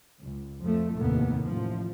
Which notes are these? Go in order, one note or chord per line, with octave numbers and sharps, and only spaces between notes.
C#2
F2 F3 A3
F1 D#2 A2 D#3 A#3 B3
A1 F3